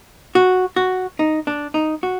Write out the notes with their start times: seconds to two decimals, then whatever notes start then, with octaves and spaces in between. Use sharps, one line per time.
0.35 F#4
0.76 F#4
1.19 D#4
1.47 D4
1.74 D#4
2.03 F#4